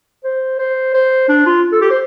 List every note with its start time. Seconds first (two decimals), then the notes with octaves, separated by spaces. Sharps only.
0.24 C5
0.59 C5
0.94 C5
1.29 D4
1.46 F4
1.72 A4
1.81 G4
1.90 C5